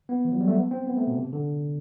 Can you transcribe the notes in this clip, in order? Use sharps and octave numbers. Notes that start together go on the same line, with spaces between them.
B3
E3
F#3
G3
A3
B3
C4
B3
A3
B2
C3
D3